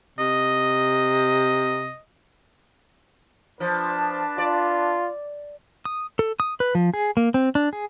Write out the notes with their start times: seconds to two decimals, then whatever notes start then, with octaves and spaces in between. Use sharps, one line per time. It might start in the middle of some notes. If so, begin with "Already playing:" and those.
0.19 C3 D#5
3.60 F3 D4 B4 A5
4.38 F4 D5
5.85 D#6
6.19 A4
6.40 D#6
6.60 B4
6.75 F3
6.94 G#4
7.17 A#3
7.34 C4
7.55 D4
7.73 G#4